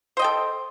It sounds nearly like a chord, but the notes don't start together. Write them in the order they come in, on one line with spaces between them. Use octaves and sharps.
C5 D#5 G5 A4